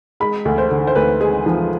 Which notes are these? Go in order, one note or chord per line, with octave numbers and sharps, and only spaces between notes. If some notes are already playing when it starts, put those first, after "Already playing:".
G#3 B5
D2
C5
D3
C5
D2 B4
G#3 G#4
F3